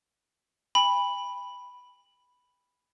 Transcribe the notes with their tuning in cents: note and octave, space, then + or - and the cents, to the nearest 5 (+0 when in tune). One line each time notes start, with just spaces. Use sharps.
G5 +45 B5 +0